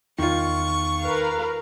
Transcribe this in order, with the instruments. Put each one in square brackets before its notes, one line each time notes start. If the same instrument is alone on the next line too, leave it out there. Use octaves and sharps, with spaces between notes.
[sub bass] E2 [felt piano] D#3 F4 [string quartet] C#6
[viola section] A#4 B4 F5